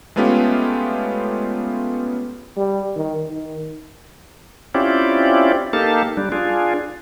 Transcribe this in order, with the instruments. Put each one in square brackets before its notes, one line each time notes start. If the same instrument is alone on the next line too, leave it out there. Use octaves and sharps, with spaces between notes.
[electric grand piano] G#3 A3 B3 C#4 F4 G4
[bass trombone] G3
D#3
D#3
[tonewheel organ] C4 C#4 E4 F4 G4 D5
A#3 D#4 G4 A4 F5 A5
G3 D4
D4 F4 G#4